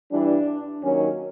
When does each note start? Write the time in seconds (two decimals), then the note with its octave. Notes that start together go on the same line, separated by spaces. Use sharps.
0.12 G2 E3 G3 D4
0.83 D#2 D#3 F#3 C#4